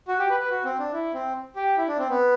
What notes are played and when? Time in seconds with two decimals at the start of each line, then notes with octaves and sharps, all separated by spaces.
0.08 F#4
0.19 G4
0.30 B4
0.40 B4
0.50 F#4
0.65 C4
0.79 D4
0.93 E4
1.14 C4
1.56 G4
1.78 E4
1.88 D4
1.98 C4
2.09 B3